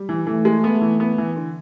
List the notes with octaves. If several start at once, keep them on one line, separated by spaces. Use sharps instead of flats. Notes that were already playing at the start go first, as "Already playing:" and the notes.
Already playing: G3
E3
E3 A3
G#3
B3
E3
B3
E3
D3